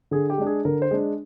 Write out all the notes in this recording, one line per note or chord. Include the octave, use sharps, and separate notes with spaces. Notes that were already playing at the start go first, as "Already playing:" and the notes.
D3 G#4
G4
G#3 D4
G#4
D3 A#4
C5
G#3 D4